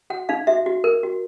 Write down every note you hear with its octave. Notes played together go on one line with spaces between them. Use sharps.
F#4 F#5
D#4 F5
F#4 E5
F#4
A#4
F#4